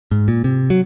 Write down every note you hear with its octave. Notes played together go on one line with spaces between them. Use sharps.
G#2
A#2
C3
F#3